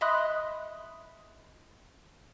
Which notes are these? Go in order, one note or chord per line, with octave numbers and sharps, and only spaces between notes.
D#5 E5 B5 C6 D#6 F#6